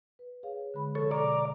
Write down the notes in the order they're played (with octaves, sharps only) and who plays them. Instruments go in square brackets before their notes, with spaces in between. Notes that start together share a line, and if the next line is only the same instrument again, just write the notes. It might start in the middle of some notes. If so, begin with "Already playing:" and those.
[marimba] B4
G#4 C#5 F5
D3 G#3 B5
[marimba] C3 F3 [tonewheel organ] A4 C#5
[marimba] B2 D6 [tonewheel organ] D5 [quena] A#5